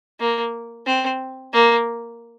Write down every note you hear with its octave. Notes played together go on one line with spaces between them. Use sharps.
A#3
C4
A#3